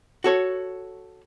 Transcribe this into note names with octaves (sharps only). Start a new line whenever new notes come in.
F#4 A4 C#5